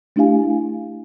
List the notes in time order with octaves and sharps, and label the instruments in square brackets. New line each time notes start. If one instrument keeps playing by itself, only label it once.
[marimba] A3 D4 E4 G4 F5 G#5